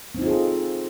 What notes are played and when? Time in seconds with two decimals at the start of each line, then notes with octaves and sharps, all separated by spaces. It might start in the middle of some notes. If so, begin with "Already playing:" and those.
0.15 C4
0.18 D#4
0.22 F4
0.26 G#4
0.30 A4